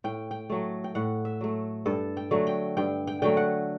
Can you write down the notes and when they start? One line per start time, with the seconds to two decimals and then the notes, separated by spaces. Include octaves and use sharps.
0.04 A2 G5
0.31 G5
0.50 F#3 A3
0.84 G5
0.95 A2 F#5
1.25 E5
1.41 F#3 A3
1.86 G2 A4
2.17 G5
2.31 D3 F#3 A3
2.47 G5
2.77 G2 G5
3.07 G5
3.22 D3 F#3 A3 G5
3.37 F#5